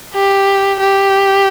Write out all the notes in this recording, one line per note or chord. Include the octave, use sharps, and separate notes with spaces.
G4
G4